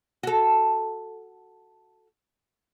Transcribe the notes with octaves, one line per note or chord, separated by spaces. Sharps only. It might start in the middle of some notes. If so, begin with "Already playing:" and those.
F#4 A4